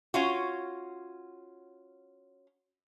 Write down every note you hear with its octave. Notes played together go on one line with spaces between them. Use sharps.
C#4 F4 F#4